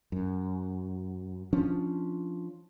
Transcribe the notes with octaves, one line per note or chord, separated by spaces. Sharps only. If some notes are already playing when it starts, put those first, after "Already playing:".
F#2
F3 C#4 D4